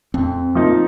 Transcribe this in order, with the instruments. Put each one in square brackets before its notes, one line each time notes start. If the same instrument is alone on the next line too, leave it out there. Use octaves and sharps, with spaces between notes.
[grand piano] F2 [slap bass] C4
[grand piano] F3 A#3 D#4